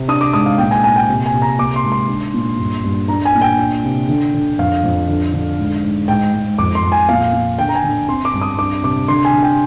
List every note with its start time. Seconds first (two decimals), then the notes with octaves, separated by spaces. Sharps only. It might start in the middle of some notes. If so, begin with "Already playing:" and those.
Already playing: C3
0.08 D4 D#6
0.21 D6
0.33 G#2 D#6
0.46 F5
0.58 A#2 G5
0.71 G#5
0.84 A#2 G#5
0.96 G5
1.08 C3
1.26 G#5
1.33 C3
1.42 A#5
1.58 A#3 D6
1.76 C6
1.83 G#2
1.92 C6
2.09 D4
2.34 A#2
2.58 G2
2.84 G2
3.08 D4 A#5
3.25 G#5
3.34 A#2
3.41 G5
3.59 D4
3.84 C3
4.09 D3
4.34 D3
4.58 F2 F5
4.84 F2
5.08 D3
5.34 D3
5.59 G#2
5.84 G#2
6.08 G#2 G5
6.33 G#2
6.58 F2 D6
6.75 C6
6.83 F2
6.92 G#5
7.09 A#2 F5
7.33 A#2
7.59 D3 G5
7.69 A#5
7.75 G#5
7.84 D3
8.08 C4 C6
8.25 D6
8.33 G2
8.41 D#6
8.58 D4 D6
8.83 C3 D6
9.08 D3 C6
9.25 G#5
9.33 D3
9.42 G5